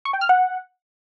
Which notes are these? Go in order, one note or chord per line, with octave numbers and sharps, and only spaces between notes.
C#6
G5
F6
F#5